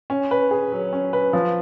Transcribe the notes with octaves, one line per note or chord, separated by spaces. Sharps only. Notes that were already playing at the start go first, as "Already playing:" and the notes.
C#4
B4
G#4
F#3
C#4
B4
F3